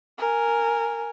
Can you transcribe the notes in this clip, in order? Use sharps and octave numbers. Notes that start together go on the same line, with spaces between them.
A#4 G#5